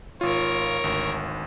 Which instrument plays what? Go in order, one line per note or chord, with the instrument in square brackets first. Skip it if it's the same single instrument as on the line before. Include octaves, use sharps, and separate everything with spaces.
[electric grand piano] G#1 F4 [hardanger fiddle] A#4 C#5
[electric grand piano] G#1 D2